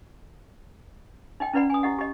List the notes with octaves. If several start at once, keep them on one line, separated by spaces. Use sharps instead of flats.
D#4 D#5 G5
C#4 E4 B4 D5 F#5 B5
G#5 D#6
E4 G4 D#5 F#5
G4 D#5